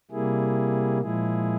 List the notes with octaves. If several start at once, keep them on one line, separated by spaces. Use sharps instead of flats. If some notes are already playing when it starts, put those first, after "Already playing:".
C3 G3 A#3 E4 G#4
A#2 F3 G#3 E4 G#4